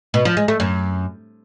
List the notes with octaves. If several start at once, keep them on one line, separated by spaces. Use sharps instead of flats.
B2
F3
G#3
A3
F#2